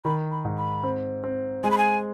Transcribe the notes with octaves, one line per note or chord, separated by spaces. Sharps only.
D#3 B5
B5
G#2
B5
C4
C4
G#3 G#5
B5
G#5